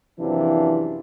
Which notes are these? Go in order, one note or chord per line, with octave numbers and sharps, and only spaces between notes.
F#2 C3 E3 F3 D4 F4